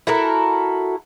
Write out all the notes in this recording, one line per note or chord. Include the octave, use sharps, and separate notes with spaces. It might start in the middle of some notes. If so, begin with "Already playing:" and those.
E4 F#4 A4 A#4